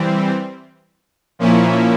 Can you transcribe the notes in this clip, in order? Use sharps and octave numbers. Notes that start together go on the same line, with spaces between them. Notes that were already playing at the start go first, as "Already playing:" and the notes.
Already playing: E3 G3 C4
A#2 F3 A#3 C#4 E4